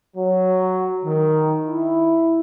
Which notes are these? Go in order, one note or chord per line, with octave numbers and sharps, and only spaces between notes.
F#3
D#3
E4